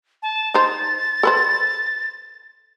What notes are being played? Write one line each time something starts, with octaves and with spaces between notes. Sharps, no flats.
A5
D#4 C5 A6
A4 B4 C5